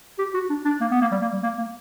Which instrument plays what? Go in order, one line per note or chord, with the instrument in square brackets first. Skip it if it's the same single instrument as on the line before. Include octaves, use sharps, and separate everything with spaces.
[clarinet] G4
F#4
D4
D4
A#3
B3
A#3
G3
A#3
G3
A#3
A#3